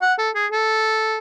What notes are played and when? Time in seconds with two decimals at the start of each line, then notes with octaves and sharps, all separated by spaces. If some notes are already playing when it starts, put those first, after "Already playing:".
0.02 F#5
0.18 A4
0.35 G#4
0.52 A4